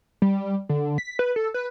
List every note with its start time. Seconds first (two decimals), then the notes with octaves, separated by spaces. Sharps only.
0.22 G3
0.69 D3
0.98 B6
1.19 B4
1.36 A4
1.54 B4